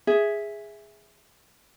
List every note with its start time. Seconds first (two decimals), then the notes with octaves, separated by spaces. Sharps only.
0.07 G#4 E5